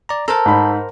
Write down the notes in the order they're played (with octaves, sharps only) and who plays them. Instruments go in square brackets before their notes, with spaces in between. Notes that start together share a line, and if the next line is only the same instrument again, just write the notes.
[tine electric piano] D5 A#5
[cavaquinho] A4 [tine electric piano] A#4 C5 A#5
[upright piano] G#2 B5